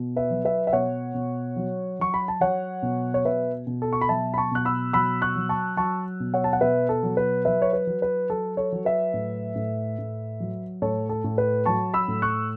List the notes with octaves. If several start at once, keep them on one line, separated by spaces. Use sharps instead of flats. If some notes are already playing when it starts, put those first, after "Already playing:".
Already playing: B2
B4 E5
F#3
B4 E5
E5
B2 C#5 F#5
B2
F#3
F#3 C#6
B5
A5
F#3 C#5 F#5
B2
C#5
B2 B4 E5
B2
A4
C#6
B5
F#3 E5 A5
B5
A5 C#6
B2 F#6
B5 E6
F#3 B5 E6
C#6 F#6
F#3
A5 C#6
F#3 A5 C#6
B2
C#5 F#5
A5
F#5
B2 B4 E5
A4
F#3
B4
F#3 B4 E5
C#5
B4
F#3
B4
F#3 A4
A4 C#5
F#3
B4 E5
A2
A2
A2
F#3
A2 A4 C#5
A4
A2
B4
F#3 A5 C#6
B5 E6
A2
C#6 F#6